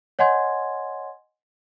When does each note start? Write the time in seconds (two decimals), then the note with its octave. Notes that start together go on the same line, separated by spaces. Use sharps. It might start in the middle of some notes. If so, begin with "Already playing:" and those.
0.19 C#5 D#5 F#5 G#5 C6 G#6